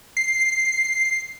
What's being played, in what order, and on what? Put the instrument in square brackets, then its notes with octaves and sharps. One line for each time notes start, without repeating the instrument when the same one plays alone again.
[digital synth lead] C7